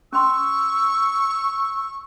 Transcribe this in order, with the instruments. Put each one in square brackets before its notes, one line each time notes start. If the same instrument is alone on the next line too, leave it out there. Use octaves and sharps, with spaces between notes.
[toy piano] C#4 C6 [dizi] C#6 [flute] E6